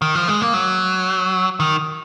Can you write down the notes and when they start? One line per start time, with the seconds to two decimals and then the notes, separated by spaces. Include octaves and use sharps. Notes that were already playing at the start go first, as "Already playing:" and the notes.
0.02 D#3
0.15 F3
0.28 G#3
0.41 A#3
0.54 F#3
1.60 D#3